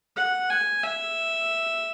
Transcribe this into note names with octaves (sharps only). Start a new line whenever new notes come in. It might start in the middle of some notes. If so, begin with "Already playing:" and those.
F#5
G#5
E5